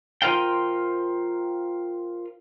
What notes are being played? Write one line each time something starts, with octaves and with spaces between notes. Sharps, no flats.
F4 F#4 A#4 C5 F5 G5